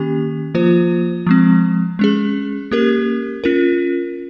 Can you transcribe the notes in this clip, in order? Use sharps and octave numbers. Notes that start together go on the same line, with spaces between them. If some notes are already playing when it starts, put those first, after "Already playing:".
Already playing: D#3 A#3 C#4 G4
F3 A#3 F4 C5
F3 G#3 C4
G#3 C#4 G#4
A#3 C#4 G4 A#4
C#4 F4 A#4